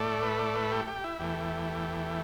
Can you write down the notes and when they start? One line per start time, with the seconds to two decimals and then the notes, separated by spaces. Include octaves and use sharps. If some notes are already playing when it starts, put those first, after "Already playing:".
Already playing: A2 A3 D5
0.23 B4
0.39 D5
0.55 B4
0.71 G4
0.87 G4
1.04 E4
1.19 E2 E3 A3 G4